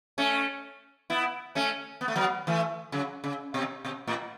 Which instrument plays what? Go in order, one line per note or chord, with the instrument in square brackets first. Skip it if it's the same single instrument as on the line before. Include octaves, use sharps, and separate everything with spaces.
[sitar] A3 C#4
B3 E4
A3 C#4
B3
A3
F#3 B3
E3 A3
C#3 F#3
C#3
B2
B2
A2